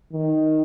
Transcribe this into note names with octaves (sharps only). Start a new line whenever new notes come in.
D#3